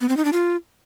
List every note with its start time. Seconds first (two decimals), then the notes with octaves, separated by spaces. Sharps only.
0.01 B3
0.09 C4
0.17 D#4
0.25 D4
0.33 F4